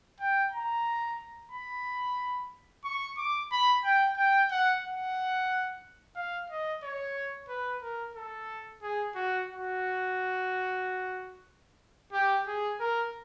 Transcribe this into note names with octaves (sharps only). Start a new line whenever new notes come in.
G5
A#5
B5
C#6
D6
B5
G5
G5
F#5
F#5
F5
D#5
C#5
B4
A#4
A4
G#4
F#4
F#4
G4
G#4
A#4